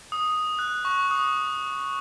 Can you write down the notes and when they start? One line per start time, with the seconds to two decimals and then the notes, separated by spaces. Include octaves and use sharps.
0.12 D#6
0.59 F#6
0.85 C#6
1.11 D#6